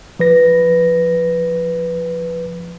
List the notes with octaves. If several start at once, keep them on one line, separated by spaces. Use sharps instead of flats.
F3 B4 A#6